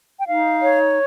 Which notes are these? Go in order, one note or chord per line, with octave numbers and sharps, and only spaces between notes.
G5
D#4 F5
C#5